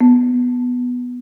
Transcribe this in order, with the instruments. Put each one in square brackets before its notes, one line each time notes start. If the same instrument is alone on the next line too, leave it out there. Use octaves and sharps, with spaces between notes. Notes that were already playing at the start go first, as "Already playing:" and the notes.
[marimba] B3